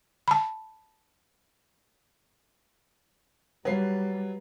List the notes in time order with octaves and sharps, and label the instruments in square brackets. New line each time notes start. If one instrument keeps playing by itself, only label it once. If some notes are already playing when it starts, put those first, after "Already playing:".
[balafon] A5 B5
[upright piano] F#3 C7 [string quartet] G3 [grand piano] B4 F5